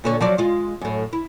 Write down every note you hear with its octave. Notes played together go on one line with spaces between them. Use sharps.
A#2 D3 C#5
F3 F#3 D5
G#3 F4
F#2 A2
E4